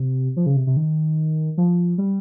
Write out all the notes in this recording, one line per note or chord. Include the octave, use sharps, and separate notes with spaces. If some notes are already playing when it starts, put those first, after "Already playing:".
Already playing: C3
F3
C#3
C3
C3
D#3
F3
G3